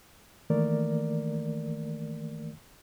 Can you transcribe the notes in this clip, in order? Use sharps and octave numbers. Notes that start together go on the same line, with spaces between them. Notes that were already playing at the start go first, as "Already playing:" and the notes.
D#3 E3 A3 A#3 A#4 D5